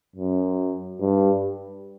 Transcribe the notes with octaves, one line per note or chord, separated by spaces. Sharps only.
F#2
G2